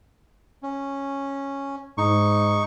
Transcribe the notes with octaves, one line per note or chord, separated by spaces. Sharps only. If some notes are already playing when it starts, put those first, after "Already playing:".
C#4
G#2 D#4 C#6